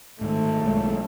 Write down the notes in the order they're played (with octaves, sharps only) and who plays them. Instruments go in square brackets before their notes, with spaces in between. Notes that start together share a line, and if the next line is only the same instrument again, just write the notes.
[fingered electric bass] G#2 D#3 [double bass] A3
[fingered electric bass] B1 G#3